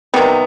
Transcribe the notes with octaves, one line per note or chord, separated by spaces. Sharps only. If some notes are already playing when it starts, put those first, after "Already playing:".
C3 D#3 G3 B3